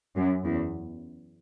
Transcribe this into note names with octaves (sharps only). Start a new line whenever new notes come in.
F#2
E2